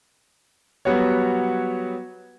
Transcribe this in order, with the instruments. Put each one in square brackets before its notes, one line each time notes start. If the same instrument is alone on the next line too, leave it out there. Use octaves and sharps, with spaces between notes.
[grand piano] F#3 G3 B3 F#4 C#5